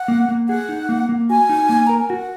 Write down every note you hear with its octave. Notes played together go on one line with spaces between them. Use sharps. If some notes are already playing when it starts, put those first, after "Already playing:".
Already playing: F#5
A#3
A#3
G#4 F#5
D#4
A#3
A#3
F#4 G#5
D#4
A#3
A#4 A#5
G#5
F#4 F#5